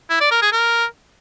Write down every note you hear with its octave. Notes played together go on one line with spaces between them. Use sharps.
E4
D5
A#4
G#4
A#4